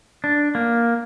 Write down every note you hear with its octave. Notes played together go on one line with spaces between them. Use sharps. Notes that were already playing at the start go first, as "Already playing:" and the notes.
D4
A#3